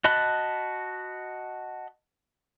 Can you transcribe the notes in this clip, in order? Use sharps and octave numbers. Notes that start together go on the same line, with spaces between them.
F#4 D#5 A5 B5 F#6